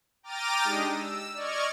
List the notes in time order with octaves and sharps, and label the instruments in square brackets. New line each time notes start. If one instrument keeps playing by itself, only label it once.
[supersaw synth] G5 A#5 D6 F6 A6 D#7
G#3 D4 D#4 G4 D#6 A#6
E6
D5 D#5 C#6 F6 G#6